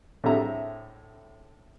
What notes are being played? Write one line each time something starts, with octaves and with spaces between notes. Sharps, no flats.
A2 D3 C4 G#4 E5 A#5